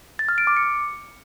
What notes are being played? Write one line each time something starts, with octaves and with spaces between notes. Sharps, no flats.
A6
F6
D7
D6
C#7